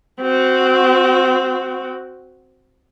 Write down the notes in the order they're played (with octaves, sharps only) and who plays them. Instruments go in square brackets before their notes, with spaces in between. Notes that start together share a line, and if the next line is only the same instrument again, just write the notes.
[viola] C4 F#4